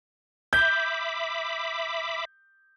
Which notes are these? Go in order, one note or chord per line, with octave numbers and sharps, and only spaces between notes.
E5 B5 D6 G6